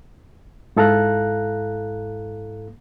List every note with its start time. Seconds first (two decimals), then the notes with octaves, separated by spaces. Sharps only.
0.76 G#2 E4 A4 F5 A#5 F#6